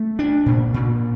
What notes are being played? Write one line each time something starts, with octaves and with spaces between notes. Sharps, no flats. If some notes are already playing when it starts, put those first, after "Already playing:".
Already playing: A3
D4
A#2
A#2